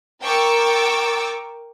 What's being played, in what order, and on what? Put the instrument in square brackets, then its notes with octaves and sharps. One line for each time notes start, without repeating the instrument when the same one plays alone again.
[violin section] A#4 G5 C#6 D6 E6 A6